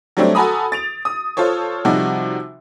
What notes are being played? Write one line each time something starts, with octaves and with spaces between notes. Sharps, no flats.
F#3 G3 A3 C4 D4
F#4 A4 G#5 A#5 B5 D#6
A6 D7 F7
D#6
F4 A4 C5 C#5
C3 F3 G3 D#4 F#4